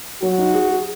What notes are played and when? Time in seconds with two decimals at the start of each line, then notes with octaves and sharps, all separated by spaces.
0.22 F#3 F#4
0.38 D#4
0.54 G#4
0.71 G#4